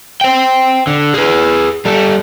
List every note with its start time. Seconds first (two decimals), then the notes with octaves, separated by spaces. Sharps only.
0.21 C5 G5
0.87 D3
1.14 G#4 B4
1.85 G3 A4